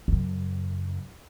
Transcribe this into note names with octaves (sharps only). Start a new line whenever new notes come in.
F#2 C#3